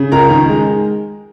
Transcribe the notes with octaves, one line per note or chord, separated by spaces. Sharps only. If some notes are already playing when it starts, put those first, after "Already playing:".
Already playing: C#3
C#2 A#4 A#5
D#3
G#3